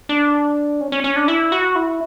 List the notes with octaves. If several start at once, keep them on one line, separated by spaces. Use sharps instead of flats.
D4
C#4
C#4
C#4
D4
E4
F#4
E4